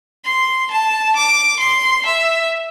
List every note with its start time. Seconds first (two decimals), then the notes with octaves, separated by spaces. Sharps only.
0.25 C6
0.71 A5
1.16 D6
1.60 C6
2.06 E5